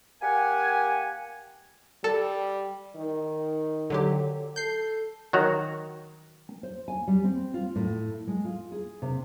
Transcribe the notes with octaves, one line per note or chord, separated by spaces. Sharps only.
A#3 G4 F#5 G#5
G3 A4
D#3
D3 F#3 G4
A4 G6 C7
D#3 F#3 F#4 C#5 A#5
C5
G#5
G3
C4
F4
A2
G#3
F4
G#4
C3